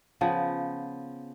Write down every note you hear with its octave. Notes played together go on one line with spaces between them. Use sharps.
C#3 F3 B3